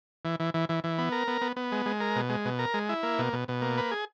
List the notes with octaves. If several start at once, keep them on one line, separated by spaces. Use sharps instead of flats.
E3
E3
E3
E3
E3
B3
A#4
B3
B3
B3
G#3
G#3
A#4
B2
G#3
B2
A#4
G#3
E4
A#3
B2
B2
B2
A#3
B4
G#4